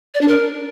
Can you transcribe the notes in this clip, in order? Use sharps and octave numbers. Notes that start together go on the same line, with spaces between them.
D5
D4
A#4